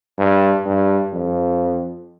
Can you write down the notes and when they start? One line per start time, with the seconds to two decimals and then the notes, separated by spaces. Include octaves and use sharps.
0.18 G2
0.65 G2
1.13 F2